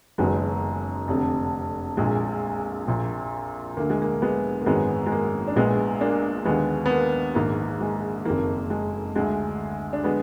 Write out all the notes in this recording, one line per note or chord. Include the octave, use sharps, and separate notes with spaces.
F#1 F#2 D#3 G#3 B3
F1 F2 D3
A#1 A#2 G#3
A#1 A#2
D2 D3 A#3
G#3
A#3
G#3 B3
A#3
G#1 F#2 D#3 G#3 B3
G#3
A#3
D4
A#1 A#2 G#3 B3
A#3 D4
D#2 D3 G#3 B3
B3
A#3
A#1 G#2 D#3 A#3
G#3
F#1 F2 D#3 A#3
G#3
D2 D3 G#3
D4
D3 G#3 B3